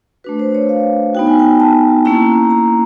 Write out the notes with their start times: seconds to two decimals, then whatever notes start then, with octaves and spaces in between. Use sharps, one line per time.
0.24 A3 D4 F#4 B4
0.39 C5
0.55 C#5
0.69 F5
1.15 B3 D#4 F#4 G5
1.27 G#5
1.39 G5
1.60 A5
2.05 A#3 C#4 E4 A#5
2.50 A#5